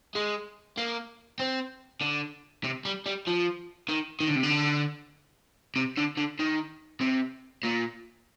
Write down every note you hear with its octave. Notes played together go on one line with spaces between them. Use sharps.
G#3
A#3
C4
D3
C3
G3
G3
F3
D#3
D#3
D3
C3
D3
C3
D3
D3
D#3
C3
A#2